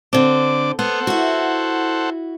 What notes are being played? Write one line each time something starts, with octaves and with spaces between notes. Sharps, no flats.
D3 C4 D4 D6
B3 A4 C5 F#5
E4 F#4